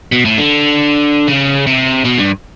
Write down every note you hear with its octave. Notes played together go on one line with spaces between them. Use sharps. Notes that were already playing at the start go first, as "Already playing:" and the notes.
B2
A2
D3
C#3
C3
B2
G2